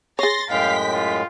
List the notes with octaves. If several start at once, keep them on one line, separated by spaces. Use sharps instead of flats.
G#4 C#5 C6 A6 A#6
F#2 A2 G#3 F5 G5 B6
F4